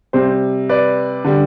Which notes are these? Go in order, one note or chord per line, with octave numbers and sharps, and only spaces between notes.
C3 G3 C5
B4 D5
D3 G3